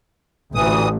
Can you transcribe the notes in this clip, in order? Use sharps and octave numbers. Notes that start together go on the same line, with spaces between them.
A1 D2 E3 D#6